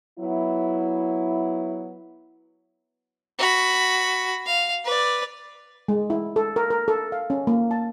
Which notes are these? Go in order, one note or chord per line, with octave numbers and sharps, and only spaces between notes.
F#3 B3 E4
F#4 B5
F5
B4 D5
G#3
E4
A4
A#4
A#4
A4
F5
C#4
A#3
A5